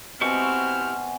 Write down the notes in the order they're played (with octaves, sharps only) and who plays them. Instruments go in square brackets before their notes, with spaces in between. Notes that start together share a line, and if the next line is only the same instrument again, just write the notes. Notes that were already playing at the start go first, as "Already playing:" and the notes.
[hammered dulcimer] B2 F#5 G#5 [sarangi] C4 [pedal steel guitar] E4 G4 C#6 [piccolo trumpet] F6